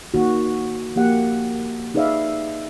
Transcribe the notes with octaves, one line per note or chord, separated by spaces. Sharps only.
D#3 A#3 F#4
F3 A#3 G4 F#5
D#4 G#4 B4 D5 E5 F5